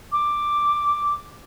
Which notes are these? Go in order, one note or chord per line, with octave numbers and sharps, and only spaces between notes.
D6